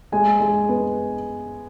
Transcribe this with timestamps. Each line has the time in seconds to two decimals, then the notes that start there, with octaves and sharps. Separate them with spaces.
0.12 G#3 G#5
0.40 G#3
0.69 B3